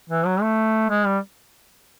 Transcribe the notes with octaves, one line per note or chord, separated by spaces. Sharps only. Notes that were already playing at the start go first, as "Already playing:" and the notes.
E3
F#3
A3
G#3
G3